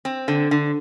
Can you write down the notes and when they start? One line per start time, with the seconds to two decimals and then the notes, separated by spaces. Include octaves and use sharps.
0.05 C4
0.28 D3
0.51 D3